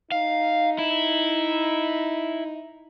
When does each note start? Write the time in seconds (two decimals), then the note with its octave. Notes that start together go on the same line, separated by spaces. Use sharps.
0.12 D#4 F5
0.78 E4